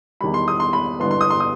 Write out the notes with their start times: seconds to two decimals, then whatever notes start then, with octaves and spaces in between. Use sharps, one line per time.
0.21 E2 D#3 G3 B5
0.34 C6
0.48 D#6
0.60 C6
0.73 B5
1.00 G1 G2 E3 B3 C6
1.11 C6
1.21 D#6
1.30 C6
1.40 D#6